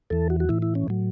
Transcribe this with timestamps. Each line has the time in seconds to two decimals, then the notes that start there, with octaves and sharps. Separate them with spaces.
0.10 E2 E3 A4
0.30 F#4
0.40 F#4
0.49 A2 E3 E4
0.62 E4
0.75 C#4
0.88 A2 F#3